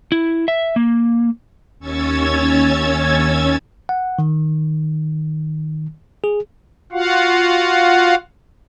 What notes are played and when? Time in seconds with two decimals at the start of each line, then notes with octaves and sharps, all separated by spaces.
0.12 E4
0.48 E5
0.76 A#3
1.79 D#2 C#4 C#5 E6 G#6 A6
3.89 F#5
4.19 D#3
6.24 G#4
6.92 F4 F#4 F5 F#5